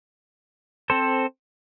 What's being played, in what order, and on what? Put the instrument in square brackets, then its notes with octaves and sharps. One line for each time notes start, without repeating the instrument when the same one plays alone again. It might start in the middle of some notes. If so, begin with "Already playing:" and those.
[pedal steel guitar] C4 A4 C5